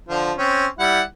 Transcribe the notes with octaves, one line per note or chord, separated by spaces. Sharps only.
D3 F3
C4 C#4
G3 E4 F#5